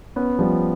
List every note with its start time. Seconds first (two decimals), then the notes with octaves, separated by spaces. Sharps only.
0.16 B3 C#4
0.39 F3 G3